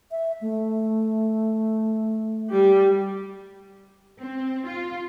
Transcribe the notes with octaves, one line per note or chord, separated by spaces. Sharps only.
E5
A3
G3 G4
C4
F4